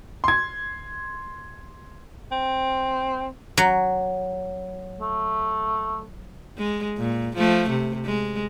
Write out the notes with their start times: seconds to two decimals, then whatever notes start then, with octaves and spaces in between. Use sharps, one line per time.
0.24 C6 G#6
2.32 C4
3.57 F#3
5.01 A3
6.58 G#3
6.98 A#2
7.36 F3 A3
7.69 C3
8.05 G#3